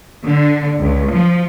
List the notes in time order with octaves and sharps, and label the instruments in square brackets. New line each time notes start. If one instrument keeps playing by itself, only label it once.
[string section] D3
C#2
F3